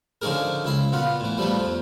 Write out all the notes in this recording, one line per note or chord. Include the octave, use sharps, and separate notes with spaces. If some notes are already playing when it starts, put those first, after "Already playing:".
D3 F3 C#4 D#4 G#4 A#4
C#2 E4 C6
A#2 B3 F4
A2 E3
F3 G3 A3 B3
F2 F3